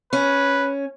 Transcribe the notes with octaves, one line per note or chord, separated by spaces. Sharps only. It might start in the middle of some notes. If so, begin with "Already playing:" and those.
C#4 B4